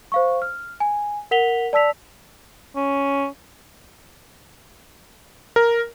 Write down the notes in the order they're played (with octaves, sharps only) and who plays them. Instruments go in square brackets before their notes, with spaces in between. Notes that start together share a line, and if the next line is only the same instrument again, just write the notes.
[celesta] C5 F5 C#6
F6
G#5
A#4 F#5 B6 F7 G7
D5 A5 E6 B6 F7
[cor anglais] C#4
[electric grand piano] A#4